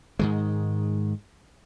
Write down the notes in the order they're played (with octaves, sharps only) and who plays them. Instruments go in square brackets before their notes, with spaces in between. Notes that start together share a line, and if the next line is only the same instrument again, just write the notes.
[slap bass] G#2 D#3 G#3